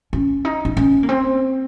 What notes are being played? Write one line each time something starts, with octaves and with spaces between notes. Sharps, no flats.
C#4
D#4
D#4
C#4
A#3
C4